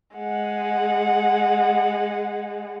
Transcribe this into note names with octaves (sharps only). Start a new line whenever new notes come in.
G#3 F#5